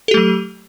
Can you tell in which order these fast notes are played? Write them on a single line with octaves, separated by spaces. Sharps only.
A4 G4 A3 F#3